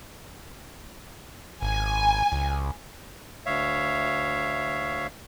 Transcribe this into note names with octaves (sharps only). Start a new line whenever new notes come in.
G#1 G#5
C#2
D2 C#5 E5 F5